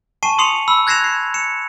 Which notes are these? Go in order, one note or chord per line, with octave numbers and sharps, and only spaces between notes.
G#5 A5 C#6 C7 D#7
C6 D#6 C7 C#7 F7 F#7
B5 E6
F#6 G#6 A#6 C7 E7 F7
C7
C#7 E7